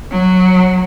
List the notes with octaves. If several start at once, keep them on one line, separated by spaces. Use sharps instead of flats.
F#3